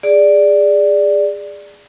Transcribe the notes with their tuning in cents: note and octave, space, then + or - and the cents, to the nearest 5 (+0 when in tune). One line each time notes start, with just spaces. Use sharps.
G#4 -15 D5 +0